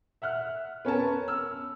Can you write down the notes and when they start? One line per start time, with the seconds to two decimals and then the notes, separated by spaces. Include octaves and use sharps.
0.22 E5 F#5 F6 F#6
0.85 B3 C#4 A#4 A5
1.28 E6 F6